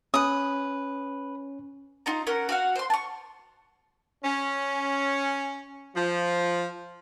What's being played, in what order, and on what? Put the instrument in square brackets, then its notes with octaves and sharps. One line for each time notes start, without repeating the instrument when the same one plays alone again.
[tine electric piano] C#4 [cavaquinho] B4 D#6
[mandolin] D#4 F4 A#5
C#4 A#4 F#5
F#4 F5 F#5
C5 C6
A5 C#6
[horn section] C#4
F3